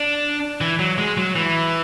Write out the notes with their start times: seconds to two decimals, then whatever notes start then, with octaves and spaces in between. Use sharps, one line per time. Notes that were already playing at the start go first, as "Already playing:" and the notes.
Already playing: D4
0.61 E3
0.79 F#3
0.98 G#3
1.17 F#3
1.35 E3